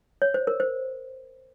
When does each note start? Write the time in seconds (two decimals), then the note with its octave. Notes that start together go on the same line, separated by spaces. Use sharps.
0.22 C#5
0.34 C5
0.47 A#4
0.60 C5